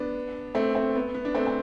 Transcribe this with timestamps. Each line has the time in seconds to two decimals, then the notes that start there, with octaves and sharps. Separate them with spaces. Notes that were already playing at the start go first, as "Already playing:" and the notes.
Already playing: B3 D4
0.55 A3 C4
0.75 A3 C4
0.95 B3
1.15 B3
1.25 D4
1.35 A3 C4
1.47 C4